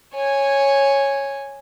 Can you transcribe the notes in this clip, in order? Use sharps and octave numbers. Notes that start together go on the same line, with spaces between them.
C#5 G#5